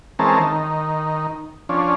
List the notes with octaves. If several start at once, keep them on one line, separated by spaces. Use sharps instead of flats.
E3 G#3 C4 C#4 A#4 A5
D#3
F3 C#4 D4